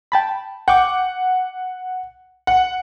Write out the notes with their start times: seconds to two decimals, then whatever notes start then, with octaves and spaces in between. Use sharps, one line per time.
0.12 G5 A5 B5
0.68 F#5 G5 C#6 D6
2.47 F#5